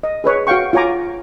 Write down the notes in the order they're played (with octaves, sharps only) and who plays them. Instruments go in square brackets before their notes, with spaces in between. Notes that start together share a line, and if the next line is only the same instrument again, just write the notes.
[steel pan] D#5
G#4 B4 C#5
F#4 C#5 F5 G5 C#6
F4 F#4 C#5 G#5 A#5 D6